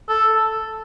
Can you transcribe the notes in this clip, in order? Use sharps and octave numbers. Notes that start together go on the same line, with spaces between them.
A4